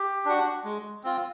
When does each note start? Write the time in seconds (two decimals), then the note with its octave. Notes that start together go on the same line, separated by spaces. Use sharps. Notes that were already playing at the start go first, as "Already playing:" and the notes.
Already playing: G4
0.25 D4 F#4
0.64 G#3
1.03 C4 F4